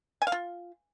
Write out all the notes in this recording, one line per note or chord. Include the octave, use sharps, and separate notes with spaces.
G#5
F5
F4